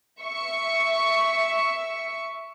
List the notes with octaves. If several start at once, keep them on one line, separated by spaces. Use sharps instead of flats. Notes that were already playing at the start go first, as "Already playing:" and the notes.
E5 C#6